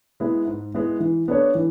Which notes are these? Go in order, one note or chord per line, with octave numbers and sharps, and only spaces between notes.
G#3 B3 E4
G#2
G#3 B3 E4
E3
B3 D4 A4 C#5
E3